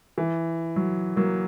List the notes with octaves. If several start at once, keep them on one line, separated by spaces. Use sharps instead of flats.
E3
F#3
F#3 A#3